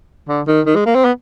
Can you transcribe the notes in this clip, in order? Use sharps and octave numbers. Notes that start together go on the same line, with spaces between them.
D3
D#3
D#3
G#3
A#3
C4
B3